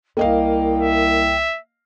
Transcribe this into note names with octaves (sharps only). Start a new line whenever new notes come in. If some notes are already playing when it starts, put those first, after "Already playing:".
C2 A#3 D#5 F5 G5
E5